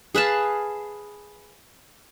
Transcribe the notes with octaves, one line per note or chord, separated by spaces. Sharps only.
G#4 B4 F5 A5